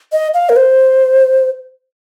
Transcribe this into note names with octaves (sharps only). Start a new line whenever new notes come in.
D#5
F5
A#4
C5